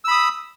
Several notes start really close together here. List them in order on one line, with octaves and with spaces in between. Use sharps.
E6 B5 D#6